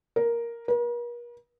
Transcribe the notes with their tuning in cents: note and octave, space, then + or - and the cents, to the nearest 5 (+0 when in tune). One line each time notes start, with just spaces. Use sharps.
A#4 +5
A#4 +45